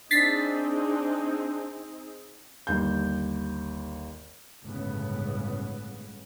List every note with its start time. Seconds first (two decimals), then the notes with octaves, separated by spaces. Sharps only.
0.11 C4 D4 D#4 G#4 A6 B6 C7
2.67 G1 D#2 G6
4.64 G1 C#2 A2 C#3 B3